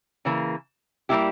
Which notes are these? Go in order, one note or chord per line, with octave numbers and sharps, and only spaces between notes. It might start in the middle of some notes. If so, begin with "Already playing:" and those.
C#3 E3 A#3
G3 A#3 E4 G4